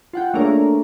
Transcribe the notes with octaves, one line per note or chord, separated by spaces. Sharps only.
F4 F#5 G5
A3 A#3 D4 G#4 A#4 C#5